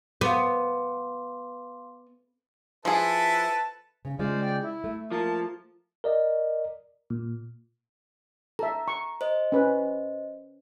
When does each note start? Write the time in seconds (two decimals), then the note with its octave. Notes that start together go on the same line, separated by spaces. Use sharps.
0.21 B3 F5 C6 D6
2.85 F3 E4 G#4 A4 B4 A5
4.05 C#3
4.19 C#3 G#3 F4 C5 D5 F5
4.42 D5 G5
4.63 E4
4.84 A3
5.11 F3 A#3 A5
6.04 A#4 D5 D#5
7.10 A#2
8.59 A4 E5 A#5
8.88 C#6
9.21 C5 D#5
9.52 C#4 B4